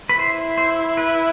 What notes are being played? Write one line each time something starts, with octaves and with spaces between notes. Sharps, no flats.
B4
E4 C5
C5
B4